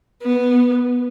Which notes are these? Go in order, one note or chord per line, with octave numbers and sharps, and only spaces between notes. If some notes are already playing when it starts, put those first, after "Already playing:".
B3